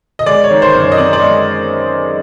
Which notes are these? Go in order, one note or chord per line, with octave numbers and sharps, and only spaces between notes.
D#5
G#3 D5
C#5
D#3
C5
F#2
C#5
D#5
C4 D5
D5
G#3 D#5